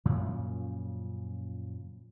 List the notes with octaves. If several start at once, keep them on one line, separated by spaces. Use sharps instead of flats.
F#2 A#2 C#3 F3